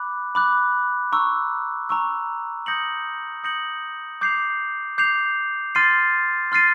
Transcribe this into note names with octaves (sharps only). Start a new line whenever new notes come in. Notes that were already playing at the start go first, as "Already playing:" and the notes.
Already playing: B5 D6 F#6
B5 D6 F#6
A#5 C#6 E6
A#5 C#6 E6
D#6 G6 A#6 C#7 F#7
D#6 G6 A#6 C#7 F#7
D6 G6 C7 F7
D6 G6 C7 F7
C6 F6 A6 C7 D#7
C6 F6 A6 C7 D#7